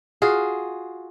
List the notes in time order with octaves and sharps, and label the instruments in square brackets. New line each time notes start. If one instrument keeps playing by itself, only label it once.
[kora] F4 F#4 G#4